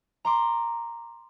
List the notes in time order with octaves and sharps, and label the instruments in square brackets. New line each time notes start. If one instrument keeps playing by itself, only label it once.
[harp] A#5 C6 D6